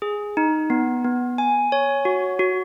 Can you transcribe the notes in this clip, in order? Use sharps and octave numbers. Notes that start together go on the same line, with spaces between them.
G#4
D#4
B3
B3
G#5
C#5
F#4
F#4